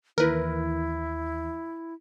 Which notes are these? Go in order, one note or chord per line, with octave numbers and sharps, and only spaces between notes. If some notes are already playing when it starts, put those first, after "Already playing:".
D#2 E3 E4 A#4 B4